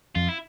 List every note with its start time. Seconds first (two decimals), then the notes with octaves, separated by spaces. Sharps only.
0.15 F2 F4
0.29 E4